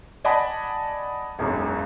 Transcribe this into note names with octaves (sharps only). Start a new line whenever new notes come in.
D5 D#5 F#5 G#5 A5 B5
E1 B1 F#2